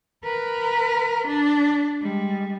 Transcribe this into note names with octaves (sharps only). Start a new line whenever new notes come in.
A#4 B4
D4
G3 G#3